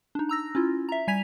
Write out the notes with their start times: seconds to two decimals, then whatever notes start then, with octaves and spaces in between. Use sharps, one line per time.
0.15 D4 D#4
0.29 A#5 E6 A#6
0.55 C#4 E4 F4
0.89 E5 A#5
1.08 G3 G#5 G#6 B6 F7